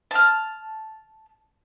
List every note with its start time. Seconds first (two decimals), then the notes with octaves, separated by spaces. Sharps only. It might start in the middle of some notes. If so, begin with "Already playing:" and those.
0.11 A5 F6